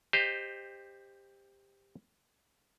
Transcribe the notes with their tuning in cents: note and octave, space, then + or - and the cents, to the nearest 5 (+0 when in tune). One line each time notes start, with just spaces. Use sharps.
G4 +15 C5 +0 D#5 -15